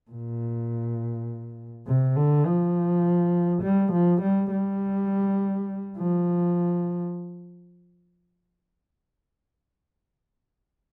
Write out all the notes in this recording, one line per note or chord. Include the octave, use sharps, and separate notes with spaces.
A#2
C3
D3
F3
G3
F3
G3
G3
F3